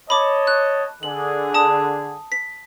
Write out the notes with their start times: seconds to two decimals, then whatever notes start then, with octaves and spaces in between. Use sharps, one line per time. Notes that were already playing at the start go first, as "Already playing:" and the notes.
0.10 C#5 D#5 A5 B5 D6
0.47 F#6
1.03 D3 G#4 F#7
1.54 A5 D#6
2.32 B6